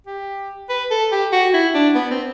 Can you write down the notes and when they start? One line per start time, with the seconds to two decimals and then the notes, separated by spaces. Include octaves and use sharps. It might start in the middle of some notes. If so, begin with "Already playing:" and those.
0.07 G4
0.69 B4
0.91 A4
1.12 G4
1.32 F#4
1.54 E4
1.74 D4
1.95 B3
2.11 C4